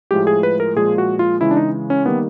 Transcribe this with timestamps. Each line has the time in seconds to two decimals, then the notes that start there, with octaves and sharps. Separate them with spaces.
0.11 A2 F3 G#3 G4
0.27 G#4
0.43 B4
0.60 A#4
0.76 A#2 F3 G#3 G#4
0.98 F#4
1.19 F4
1.41 C#3 E3 G#3 E4
1.51 D4
1.57 D#4
1.90 C#4
2.06 D#3 G3 A#3 B3